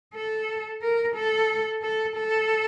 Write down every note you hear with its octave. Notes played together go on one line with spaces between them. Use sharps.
A4
A#4
A4
A4
A4